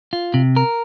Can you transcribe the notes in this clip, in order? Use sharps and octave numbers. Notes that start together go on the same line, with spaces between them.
F4
C3
A#4